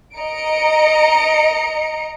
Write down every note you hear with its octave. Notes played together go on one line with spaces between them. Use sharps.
D#5 A#5 C#7 D7